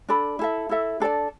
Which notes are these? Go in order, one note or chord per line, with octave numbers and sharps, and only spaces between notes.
D4 A4 D5 B5
E4 A4 E5
E4 A4 E5
D4 A4 D5 A5